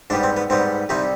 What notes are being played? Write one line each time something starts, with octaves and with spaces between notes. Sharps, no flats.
G#2 G3 B3 D4
C4
B3
G#2 G3 B3 C4
C2 C3 G3 D#4